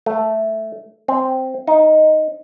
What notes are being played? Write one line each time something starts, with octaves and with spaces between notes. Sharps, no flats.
A3
C4
D#4